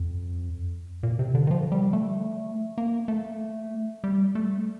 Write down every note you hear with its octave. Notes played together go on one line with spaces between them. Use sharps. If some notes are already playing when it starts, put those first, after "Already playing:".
Already playing: F2
A#2
C3
D3
D#3
F3
G3
A3
A#3
A3
G3
A3